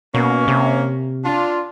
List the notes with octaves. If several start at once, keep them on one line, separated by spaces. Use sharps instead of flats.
B2 A#3 C#4
C3
D4 F4